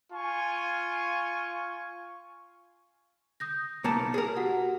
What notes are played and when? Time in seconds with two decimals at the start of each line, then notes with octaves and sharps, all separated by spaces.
0.13 F4 G#5 C#6
3.40 D#6 G6 A#6
3.84 B1 A#3 A5 C#7
4.14 G#4 A#4
4.37 F#4 G4 F#5